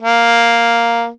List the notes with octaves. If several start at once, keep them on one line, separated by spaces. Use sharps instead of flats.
A#3